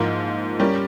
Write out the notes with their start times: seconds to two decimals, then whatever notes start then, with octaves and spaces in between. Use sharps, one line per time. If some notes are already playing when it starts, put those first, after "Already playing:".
Already playing: G#2 F3 A#3 F4 A#4
0.59 G3 C#4 G4 A#4